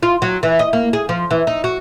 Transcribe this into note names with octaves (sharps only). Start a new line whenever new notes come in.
F4
F#3
E3
D#5
A#3
G#4
F3
E3
D#4
F#4